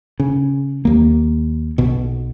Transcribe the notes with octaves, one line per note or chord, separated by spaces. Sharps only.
C#3
D#2 A#3
B1 B2